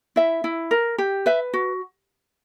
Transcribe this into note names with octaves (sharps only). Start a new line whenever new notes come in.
E4 E5
E4
A#4
G4
B4 E5
F#4